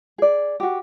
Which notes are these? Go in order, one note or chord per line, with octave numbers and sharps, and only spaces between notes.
G#4 D5
F#4 G4